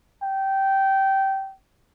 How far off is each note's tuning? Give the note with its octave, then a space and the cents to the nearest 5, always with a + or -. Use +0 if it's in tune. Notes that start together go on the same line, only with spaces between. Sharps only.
G5 -15